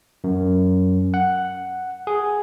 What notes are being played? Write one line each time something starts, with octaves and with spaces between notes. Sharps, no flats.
F#2
F#5
G#4